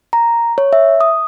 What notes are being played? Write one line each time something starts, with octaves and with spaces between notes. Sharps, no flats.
A#5
C#5
E5
D#6